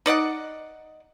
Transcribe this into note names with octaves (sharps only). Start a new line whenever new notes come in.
D#4 D5 D#5 F#5